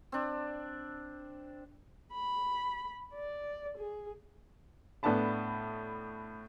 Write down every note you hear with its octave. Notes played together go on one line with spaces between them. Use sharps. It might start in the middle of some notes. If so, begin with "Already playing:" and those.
C4 D4
B5
D5
G#4
A2 B3 D4 A5 B5